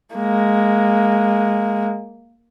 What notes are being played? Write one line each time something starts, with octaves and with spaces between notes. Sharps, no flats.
G#3 A#3